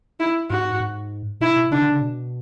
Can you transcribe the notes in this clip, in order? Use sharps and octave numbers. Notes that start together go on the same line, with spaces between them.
E4
G#2 F#4
G#2
B2 E4
B2
C#3 D4
D3
C#3
B2